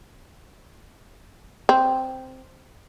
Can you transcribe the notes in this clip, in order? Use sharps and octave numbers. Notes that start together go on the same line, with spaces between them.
C4